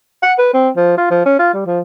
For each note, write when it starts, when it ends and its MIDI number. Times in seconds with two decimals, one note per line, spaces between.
0.23 0.33 78
0.38 0.51 71
0.54 0.69 60
0.76 0.96 53
0.97 1.10 65
1.11 1.21 53
1.26 1.37 61
1.39 1.52 65
1.53 1.62 55
1.66 1.80 53